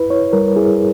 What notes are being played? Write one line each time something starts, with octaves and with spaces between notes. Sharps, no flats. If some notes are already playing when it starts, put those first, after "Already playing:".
Already playing: E4 B4
E4 C#5
G3 A#4
E4 G#4